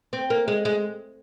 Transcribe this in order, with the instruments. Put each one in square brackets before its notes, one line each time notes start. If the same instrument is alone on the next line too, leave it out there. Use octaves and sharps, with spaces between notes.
[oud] C4
A#3
G#3
G#3